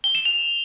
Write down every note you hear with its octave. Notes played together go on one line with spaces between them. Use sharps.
G7
E7
F7